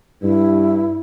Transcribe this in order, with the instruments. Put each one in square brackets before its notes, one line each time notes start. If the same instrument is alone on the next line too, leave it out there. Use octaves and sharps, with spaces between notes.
[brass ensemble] G2 [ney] E4